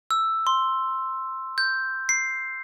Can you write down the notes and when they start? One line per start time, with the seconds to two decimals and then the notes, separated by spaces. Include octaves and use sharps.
0.11 E6
0.47 C6
1.58 G6
2.09 C7